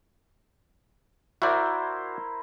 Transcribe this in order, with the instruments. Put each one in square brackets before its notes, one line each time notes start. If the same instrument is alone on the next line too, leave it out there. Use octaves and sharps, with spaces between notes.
[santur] E4 A#4 C5 [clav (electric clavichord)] F#4 D5